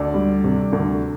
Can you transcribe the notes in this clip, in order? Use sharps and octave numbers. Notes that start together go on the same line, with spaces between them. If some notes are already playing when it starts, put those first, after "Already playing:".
Already playing: D2 A4 D5
G3
C3
D2